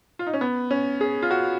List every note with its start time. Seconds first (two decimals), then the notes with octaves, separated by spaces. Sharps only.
0.19 F4
0.27 D#4
0.33 C#4
0.41 B3
0.71 C#4
1.01 G#4
1.22 F4
1.31 F#4